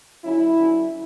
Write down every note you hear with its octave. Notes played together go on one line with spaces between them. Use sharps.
D3 F#3 C#4 E4
D3 F#3 C#4